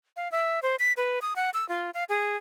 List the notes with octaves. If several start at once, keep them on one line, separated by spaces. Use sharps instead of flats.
F5
E5
C5
B6
B4
D#6
F#5
E6
F4
F5
G#4